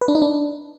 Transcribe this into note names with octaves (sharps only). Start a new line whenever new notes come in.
B4
D4
D#4
D4